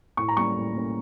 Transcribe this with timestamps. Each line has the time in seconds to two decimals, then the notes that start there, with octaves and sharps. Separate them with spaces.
0.17 A2 C#6
0.28 A#5
0.37 G3 A#3 C#4 C#6
0.56 A2
0.75 G3 A#3 C#4